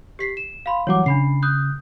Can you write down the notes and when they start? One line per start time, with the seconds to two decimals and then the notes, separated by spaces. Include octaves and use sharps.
0.19 G4 B6 C7
0.37 E7
0.66 F5 B5 C6
0.87 E3 F#3 G3 C#5 F#5 D6
1.06 C#3 D4 B5 C7
1.43 D#6 F#6 G6